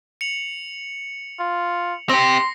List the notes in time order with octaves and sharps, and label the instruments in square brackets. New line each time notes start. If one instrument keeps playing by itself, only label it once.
[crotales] C#7 F7 F#7
[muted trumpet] F4
[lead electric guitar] C4 G4 [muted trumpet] C6 [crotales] A#6 C7